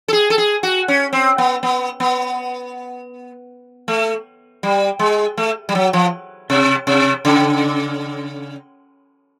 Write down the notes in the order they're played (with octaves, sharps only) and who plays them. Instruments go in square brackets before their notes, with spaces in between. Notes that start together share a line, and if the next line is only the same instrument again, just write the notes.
[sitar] A4
G#4
A4
G#4
F#4
C#4
C4
B3
B3
B3
A3
G3
G#3
A3
G3
F#3
F3
C3
C3
C#3